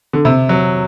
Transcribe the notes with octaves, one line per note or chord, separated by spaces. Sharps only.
D3
C3
F#3